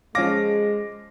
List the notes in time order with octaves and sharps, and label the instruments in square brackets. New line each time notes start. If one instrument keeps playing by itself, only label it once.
[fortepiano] F3 C#4 F5 [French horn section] G#3 [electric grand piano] D6 A#6